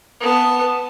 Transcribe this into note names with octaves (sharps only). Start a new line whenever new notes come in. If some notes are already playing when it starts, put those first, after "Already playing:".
B3 A5